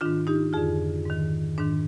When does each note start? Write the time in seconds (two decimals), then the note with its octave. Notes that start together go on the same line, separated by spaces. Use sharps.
0.01 G#2 D#3 D4 F4
0.27 D#4 G4
0.53 F2 D3 F4 G#4
1.06 G#2 D#3
1.58 G#2 D#3 D4